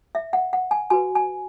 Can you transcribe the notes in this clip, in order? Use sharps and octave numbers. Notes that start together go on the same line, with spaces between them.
E5
F#5
F#5
G#5
F#4 B4 G#5
G#5